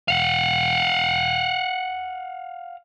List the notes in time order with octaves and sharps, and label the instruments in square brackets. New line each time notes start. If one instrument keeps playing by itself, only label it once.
[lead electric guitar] F5 F#5